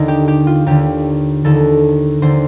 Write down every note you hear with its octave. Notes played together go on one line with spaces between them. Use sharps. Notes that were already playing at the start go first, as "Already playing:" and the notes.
Already playing: D#2 D3 D#4
G4
G4
F4
D#2 D3 G4
D#2 D3 A4
D#2 D3 C5